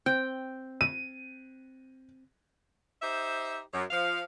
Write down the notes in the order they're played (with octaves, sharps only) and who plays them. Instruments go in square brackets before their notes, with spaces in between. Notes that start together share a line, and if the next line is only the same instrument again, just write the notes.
[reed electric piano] C4 [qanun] G5
[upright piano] D#7
[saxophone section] D#4 G4 C5 E5
F#2
F3 F5